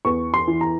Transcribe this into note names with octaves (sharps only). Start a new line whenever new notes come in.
E2 C#6
C6
E3
A#5